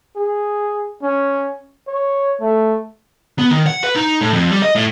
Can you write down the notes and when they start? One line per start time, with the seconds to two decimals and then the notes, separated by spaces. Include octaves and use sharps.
0.16 G#4
1.03 C#4
1.88 C#5
2.41 A3
3.39 B3
3.51 D#3
3.67 F#5
3.84 B4
3.96 D#4
4.21 A2
4.33 F2
4.51 G3
4.62 D#5
4.75 A2